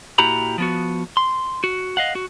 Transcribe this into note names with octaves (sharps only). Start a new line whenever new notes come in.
A#2 E4 F#4 G4 A#5 B5
F3 B3 F#4
C6
F#4
D#5 F5 F#5
F#4